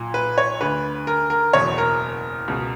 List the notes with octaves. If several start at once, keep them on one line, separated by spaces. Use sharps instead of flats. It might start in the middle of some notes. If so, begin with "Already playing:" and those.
Already playing: B1 A#2
B4
C#5
D2 D3 B4
A#4
A#4
F#1 E2 B2 C#5
A#4
C#2 B2